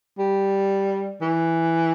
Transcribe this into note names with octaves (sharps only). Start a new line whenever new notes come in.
G3
E3